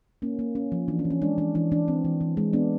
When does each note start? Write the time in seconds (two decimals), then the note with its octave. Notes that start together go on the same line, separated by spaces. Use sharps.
0.22 A#3 C#4
0.39 A#3
0.55 C#4
0.72 F3
0.88 E3 D4
0.99 C#4
1.05 E3
1.10 C#4
1.22 G#3 D4
1.38 E3 D4
1.55 E3 D4
1.71 E3 D4
1.88 C4
2.05 E3
2.21 E3
2.37 G#3
2.53 B3 D4